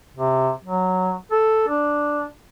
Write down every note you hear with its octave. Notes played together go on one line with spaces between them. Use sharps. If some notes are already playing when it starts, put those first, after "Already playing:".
C3
F#3
A4
D4